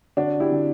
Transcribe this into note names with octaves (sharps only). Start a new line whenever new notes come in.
D3 D4 F#4
E4 G4
D3